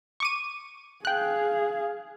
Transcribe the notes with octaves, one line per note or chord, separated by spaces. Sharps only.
C#6 D6 D#7
G#4 F5 G5 F#6